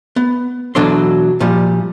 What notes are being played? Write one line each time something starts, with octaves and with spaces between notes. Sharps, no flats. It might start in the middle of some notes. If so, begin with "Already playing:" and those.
B3
B2 E3 F#3 D4 A4 C6
A#2 F3 G3